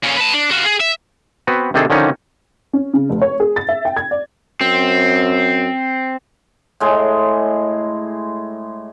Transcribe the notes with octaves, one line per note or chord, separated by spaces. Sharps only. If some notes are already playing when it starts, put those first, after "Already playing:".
A#2 C#4
B4 A5
D4
F4 F#4
G#4
E5
B3 C4 F#4 B4
C3 D#3 C4 D4 G#4 A4
D3 D#3 F3 C#4 D#4
C#4
C#3
F1
C#5
G#4
A6
E5
G5
G#6
D5
F#2 C4
A2 G#3